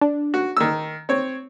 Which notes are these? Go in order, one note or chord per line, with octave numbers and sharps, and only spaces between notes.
D4
F#4
D#3 E6
C4 C#5